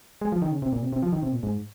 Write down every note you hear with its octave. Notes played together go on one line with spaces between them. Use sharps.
G#3
F3
D#3
C#3
C3
A#2
C3
C3
F3
D#3
C3
A#2
G#2